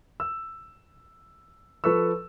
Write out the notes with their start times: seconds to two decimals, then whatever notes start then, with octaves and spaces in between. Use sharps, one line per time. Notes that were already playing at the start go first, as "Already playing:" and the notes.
0.20 E6
1.84 F3 A4 B4 C#6 E6